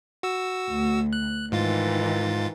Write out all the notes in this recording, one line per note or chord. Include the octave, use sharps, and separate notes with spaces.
F#4 E6
D2
F#6
G#2 D#3 E3 F4 A6